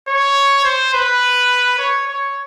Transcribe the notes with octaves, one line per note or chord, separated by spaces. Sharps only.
C#5
C5
B4
C#5
C#5